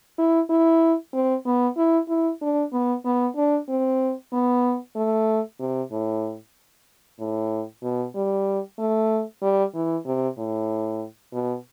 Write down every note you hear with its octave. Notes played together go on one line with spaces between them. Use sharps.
E4
E4
C4
B3
E4
E4
D4
B3
B3
D4
C4
B3
A3
C3
A2
A2
B2
G3
A3
G3
E3
C3
A2
B2